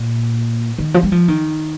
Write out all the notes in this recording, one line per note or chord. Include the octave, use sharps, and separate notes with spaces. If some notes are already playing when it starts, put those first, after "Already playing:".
Already playing: A#2
D#3
F3
G3
F3
D#3